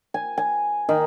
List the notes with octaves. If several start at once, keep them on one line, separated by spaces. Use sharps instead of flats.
G#5
G#5
D#3